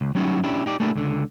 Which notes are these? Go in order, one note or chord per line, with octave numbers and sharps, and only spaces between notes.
C#2
F#3 G3 C#4 D#4 E4 F#4
C#4 D4 E4 G4
D#4 G4 D5
A3 A#3 D4 E4 G4
C#2 D3